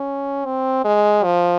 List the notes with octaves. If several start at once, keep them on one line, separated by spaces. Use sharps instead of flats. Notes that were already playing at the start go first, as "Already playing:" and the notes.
Already playing: C#4
C4
G#3
F3